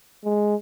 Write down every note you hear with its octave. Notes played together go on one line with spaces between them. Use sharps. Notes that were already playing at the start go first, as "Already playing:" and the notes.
G#3